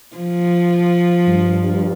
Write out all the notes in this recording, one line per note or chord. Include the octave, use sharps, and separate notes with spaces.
F3
G2